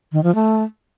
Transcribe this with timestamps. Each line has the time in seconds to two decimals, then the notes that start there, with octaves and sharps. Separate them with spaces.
0.12 D#3
0.24 F3
0.35 A3